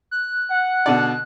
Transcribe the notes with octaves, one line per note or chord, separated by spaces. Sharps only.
F#6
F#5
B2 D3 D5